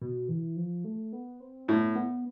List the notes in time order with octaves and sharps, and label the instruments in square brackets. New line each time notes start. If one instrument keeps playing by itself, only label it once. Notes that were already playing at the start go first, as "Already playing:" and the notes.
[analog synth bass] B2
E3
F3
A3
B3
C4
[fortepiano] A2 [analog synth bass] B3
[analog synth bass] B3